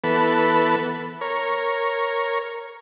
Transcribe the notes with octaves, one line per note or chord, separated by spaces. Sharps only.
E3 B3 A4 B4
A#4 C#5